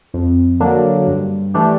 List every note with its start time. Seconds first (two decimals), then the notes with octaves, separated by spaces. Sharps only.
0.14 F2
0.60 D3 F#3 A#3 D4
1.07 G2
1.54 E3 A3 D4 G4